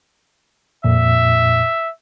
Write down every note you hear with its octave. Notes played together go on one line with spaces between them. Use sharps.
F2 A#2 E5